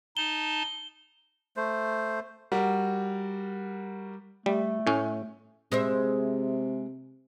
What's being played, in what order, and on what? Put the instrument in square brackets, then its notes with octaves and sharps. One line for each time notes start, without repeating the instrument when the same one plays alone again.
[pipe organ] D#4 A5 [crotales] G7
[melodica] A3 C5
[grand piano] G3 F#4 A#4
[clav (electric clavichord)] G3 [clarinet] A3
[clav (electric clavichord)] A2 C#4
[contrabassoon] C3 [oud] G#3 C5 E5